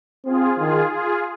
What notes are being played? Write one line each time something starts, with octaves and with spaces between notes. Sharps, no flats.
C4 F4 G#4
D#3 F4 G#4
F4 G#4